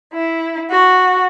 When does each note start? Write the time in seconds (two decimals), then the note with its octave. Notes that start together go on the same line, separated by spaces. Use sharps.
0.14 E4
0.70 F#4